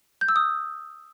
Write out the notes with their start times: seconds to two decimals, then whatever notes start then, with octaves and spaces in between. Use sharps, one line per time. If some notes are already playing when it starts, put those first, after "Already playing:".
0.21 G6
0.29 E6
0.36 D#6